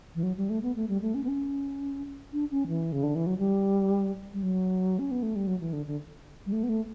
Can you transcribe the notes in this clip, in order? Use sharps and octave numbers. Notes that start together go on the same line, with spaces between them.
E3
F#3
G3
A3
B3
A3
G3
A3
C#4
B3
C#4
D4
C#4
E3
C#3
D3
E3
F#3
G3
G3
F#3
C#4
B3
A3
G3
F#3
E3
D3
D3
G3
A3
B3
A3